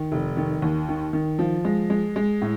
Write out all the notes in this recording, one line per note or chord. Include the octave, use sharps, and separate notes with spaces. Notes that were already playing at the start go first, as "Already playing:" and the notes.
Already playing: D#3
F1
D#3
D#2
D#3
D#3
F3
G#3
G#3
G#3
A2